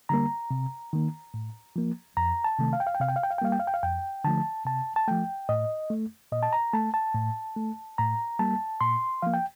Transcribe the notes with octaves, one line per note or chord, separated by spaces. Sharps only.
D3 G3 A#3 A#5
C3
D#3 A#3
A2
F3 A#3
F2 A#5
A5
C3 D#3 A3
F5
G5
F5
G5
C3 F5
G5
F5
G5
F5
G5
G3 A#3 F5
G5
F5
G5
F5
F2 G5
D3 F3 A3 A5
C3 A5
A5
F3 A3 G5
A2 D#5
A3
A#2 D#5
A5
A#5
A3 A5
A5
A2
A3
A2 A#5
G3 A#3 A5
A#2 C6
F3 A#3 F5
G5